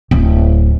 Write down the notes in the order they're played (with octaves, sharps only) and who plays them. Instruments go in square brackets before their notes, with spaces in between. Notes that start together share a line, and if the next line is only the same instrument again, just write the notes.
[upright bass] D1